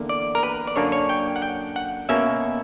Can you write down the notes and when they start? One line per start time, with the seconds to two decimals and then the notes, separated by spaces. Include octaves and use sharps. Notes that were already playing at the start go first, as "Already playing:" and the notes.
Already playing: E2 D3 A#3
0.09 D5
0.35 A#4
0.43 B4
0.67 D5
0.76 F#2 D3 A#3 D4 C#5
0.92 C#5
1.09 G5
1.36 F#5
1.42 G5
1.76 F#5
2.09 B2 A#3 C#4 E5